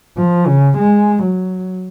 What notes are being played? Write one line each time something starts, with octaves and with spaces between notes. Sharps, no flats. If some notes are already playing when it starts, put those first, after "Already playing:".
F3
C#3
G#3
F#3